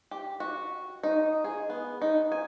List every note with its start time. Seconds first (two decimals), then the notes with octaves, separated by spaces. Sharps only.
0.11 G4
0.40 F#4
1.03 D#4
1.44 G#4
1.70 B3
2.02 D#4
2.32 G#5